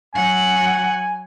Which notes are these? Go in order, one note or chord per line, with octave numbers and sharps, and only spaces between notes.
F#3 F#5 G#5